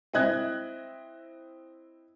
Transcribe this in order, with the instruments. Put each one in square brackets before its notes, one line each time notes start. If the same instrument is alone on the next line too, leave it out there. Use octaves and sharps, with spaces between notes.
[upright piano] C4 E4 D#5 F#6 G#6